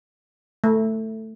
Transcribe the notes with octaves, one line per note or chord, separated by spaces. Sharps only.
A3